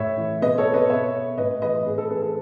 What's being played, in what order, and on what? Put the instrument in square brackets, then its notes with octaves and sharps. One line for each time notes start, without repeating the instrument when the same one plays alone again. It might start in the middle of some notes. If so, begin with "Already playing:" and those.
Already playing: [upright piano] A2 C#5 E5
E3
B2 B4 D#5
A4 C#5
B4 D#5
B2 C#5 E5
A2 B4 D#5
E3 B4 D#5
A2 G#4
A4
E3 G#4 B4
A4